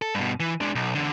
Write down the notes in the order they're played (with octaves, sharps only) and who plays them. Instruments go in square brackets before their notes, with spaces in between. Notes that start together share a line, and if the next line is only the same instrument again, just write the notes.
[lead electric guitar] A4
G2 B2
E3
G#3 D4
B1
E2 D3